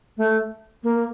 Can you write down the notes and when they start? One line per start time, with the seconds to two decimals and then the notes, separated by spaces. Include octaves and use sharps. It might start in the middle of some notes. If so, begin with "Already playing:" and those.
0.17 A3
0.83 A#3